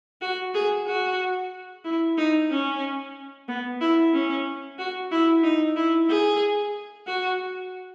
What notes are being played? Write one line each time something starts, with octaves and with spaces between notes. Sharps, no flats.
F#4
G#4
F#4
E4
D#4
C#4
B3
E4
C#4
F#4
E4
D#4
E4
G#4
F#4